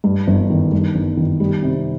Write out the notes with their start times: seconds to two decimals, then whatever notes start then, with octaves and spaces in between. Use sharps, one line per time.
0.04 G2
0.27 G1
0.50 D#3
0.72 G2
0.95 G1
1.17 D#3
1.40 G3
1.63 C3